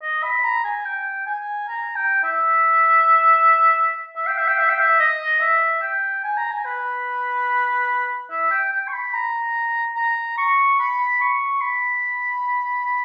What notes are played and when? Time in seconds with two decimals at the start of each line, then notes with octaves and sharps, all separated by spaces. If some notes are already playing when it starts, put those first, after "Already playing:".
0.02 D#5
0.23 B5
0.44 A#5
0.64 G#5
0.85 G5
1.26 G#5
1.68 A#5
1.96 G5
2.23 E5
4.16 E5
4.27 G5
4.38 E5
4.48 G5
4.58 E5
4.69 G5
4.80 E5
4.99 D#5
5.40 E5
5.82 G5
6.24 G#5
6.38 A#5
6.51 G#5
6.65 B4
8.31 E5
8.51 G5
8.72 G5
8.88 C#6
8.93 B5
9.14 A#5
9.96 A#5
10.38 C#6
10.79 B5
11.21 C#6
11.61 B5